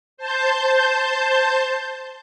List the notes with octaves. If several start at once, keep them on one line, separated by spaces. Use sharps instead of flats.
C5 A5 G6